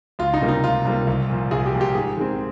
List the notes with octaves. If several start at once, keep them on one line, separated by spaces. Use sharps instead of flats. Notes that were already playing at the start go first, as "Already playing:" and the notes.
C#2 F4
D#4
C3 G3 A#3
D#4
C#2 F4
C3 G3 A#3
C2
A#2 F3
C2 G#4
G4
A#2 F3
G4
G#2 G#4
D#3 G#3 C4